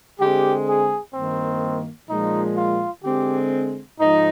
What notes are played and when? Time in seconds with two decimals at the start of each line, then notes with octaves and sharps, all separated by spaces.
0.19 D3 G#3 C4 G4
0.67 G#4
1.14 G2 D#3 A#3 C4
2.09 A#2 F3 G#3 D#4
2.57 F4
3.04 D3 G#3 C4 G4
3.99 G#2 F3 D#4